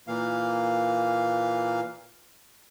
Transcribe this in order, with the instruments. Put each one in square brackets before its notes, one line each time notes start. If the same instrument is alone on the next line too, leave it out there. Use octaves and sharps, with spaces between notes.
[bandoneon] A#2 E3 A#3 F5